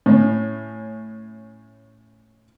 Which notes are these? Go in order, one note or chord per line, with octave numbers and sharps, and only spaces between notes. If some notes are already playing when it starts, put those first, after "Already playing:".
A2 C#4